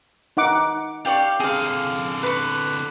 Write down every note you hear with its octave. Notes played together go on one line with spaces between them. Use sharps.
D#4 F#5 D6
G4 D5 F5 C#6
D3 C4 G#4 F5
B4 C6 C#6